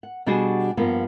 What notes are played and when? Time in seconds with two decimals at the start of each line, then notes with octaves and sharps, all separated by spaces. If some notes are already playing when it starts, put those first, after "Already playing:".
0.03 F#5
0.26 B2 G3 D4 F#4 G#4
0.77 G2 F3 A#3 B3